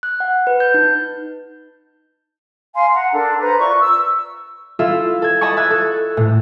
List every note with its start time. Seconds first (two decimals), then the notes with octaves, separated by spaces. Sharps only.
0.03 F#6
0.20 F#5
0.47 B4
0.60 G6
0.74 D#4
2.74 F5 G#5 C6
2.94 F#5 A#5
3.12 D4 A4 A#4
3.41 B4 C5 A#5
3.60 F4 D5 E5 C#6
3.80 E6
4.79 E4 F4 A4 E5
5.22 A4 G#6
5.41 D#5 A5 B5 C#6
5.57 E5 E6 F#6 G#6
5.70 A4
6.17 A2